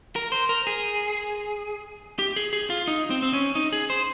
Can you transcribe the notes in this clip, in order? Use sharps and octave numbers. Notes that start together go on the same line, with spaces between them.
A#4
C5
A#4
G#4
G4
G#4
G#4
F4
D#4
C4
C4
C#4
D#4
G#4
C5